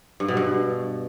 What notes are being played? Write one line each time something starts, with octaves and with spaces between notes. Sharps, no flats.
G2
B2
G2